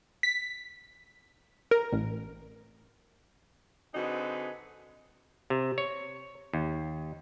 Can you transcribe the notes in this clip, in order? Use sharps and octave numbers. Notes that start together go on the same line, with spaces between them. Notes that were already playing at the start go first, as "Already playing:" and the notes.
B6
A#4
A1
D3 C4 D#4 F#4 G#4 B4
C3
C#5
D#2